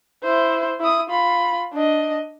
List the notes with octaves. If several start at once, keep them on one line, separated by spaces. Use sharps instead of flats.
E4 C5
E4 D#6
F4 B5
D4 D#5